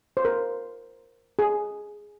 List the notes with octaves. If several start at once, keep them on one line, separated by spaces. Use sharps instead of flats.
C5
A#4
G#4